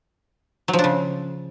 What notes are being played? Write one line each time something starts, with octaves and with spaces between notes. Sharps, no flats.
F#3
F3
D4
C#3